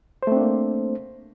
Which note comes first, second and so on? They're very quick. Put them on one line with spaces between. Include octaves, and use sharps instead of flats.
C5 A3 C4 D4 A#3